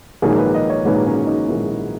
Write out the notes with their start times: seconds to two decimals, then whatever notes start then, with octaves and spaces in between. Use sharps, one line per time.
0.22 A#1 G#2 D#3 F#3 A#3 G#4
0.38 B4
0.55 D#5
0.70 C#5
0.85 A#1 G#2 D#3 F#3 A#3 B4
1.06 C#4
1.27 D#4
1.48 A#1 G#2 D#3 F#3 A#3 E4
1.69 D#4